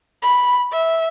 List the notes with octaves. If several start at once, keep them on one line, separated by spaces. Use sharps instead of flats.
B5
E5